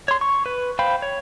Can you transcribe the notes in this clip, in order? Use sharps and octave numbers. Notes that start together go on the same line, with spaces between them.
C#5 C6
C#6
B4
C5 F5 G5 B5
C#5